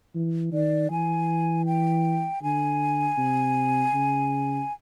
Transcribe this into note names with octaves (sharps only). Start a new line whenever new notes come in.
E3
D#3 D5
E3 G#5
G5
D3 G#5
C3
C#3